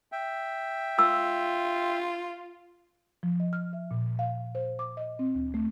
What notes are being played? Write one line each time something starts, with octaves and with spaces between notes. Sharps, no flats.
E5 G5
F4 E6
F3
D#5
F6
E5
A#2
F5
C5
D6
D#5
C4
D2
A3